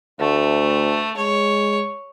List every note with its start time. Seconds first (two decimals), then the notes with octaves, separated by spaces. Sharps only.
0.20 D2 A3
1.17 G#3 C#5